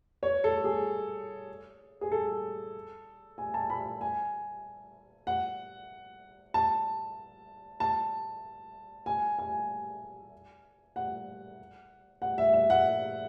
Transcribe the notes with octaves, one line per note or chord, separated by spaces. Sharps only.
C#5
A4
G#4
G#4
A4
G#5
A5
B5
G#5
F#5
A5
A5
G#5
G#5
F#5
F#5
E5
E5
F#5